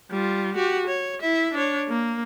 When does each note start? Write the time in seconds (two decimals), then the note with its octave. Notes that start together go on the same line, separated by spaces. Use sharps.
0.11 G3 F4
0.55 F#4 G4
0.87 C#5
1.21 E4 E5
1.53 D4 C#5
1.89 A#3